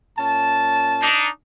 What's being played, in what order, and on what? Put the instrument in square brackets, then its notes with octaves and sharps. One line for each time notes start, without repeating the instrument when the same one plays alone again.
[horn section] A#2 C#4 A5
[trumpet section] D4 D#4